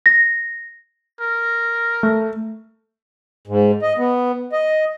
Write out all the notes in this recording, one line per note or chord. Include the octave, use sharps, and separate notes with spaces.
A#6
A#4
A3
G#2
D#5
B3
D#5